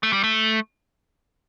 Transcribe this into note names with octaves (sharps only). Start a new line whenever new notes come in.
A3
G3
A3